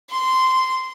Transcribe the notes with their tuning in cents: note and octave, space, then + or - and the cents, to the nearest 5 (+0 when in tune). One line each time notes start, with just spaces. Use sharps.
C6 -10